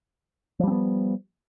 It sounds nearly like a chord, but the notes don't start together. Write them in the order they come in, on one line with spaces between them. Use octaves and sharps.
F3 G3 C4 B3